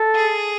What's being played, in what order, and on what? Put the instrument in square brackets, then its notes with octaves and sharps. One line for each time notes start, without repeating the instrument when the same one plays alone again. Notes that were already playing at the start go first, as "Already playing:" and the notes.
Already playing: [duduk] A4
[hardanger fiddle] G#4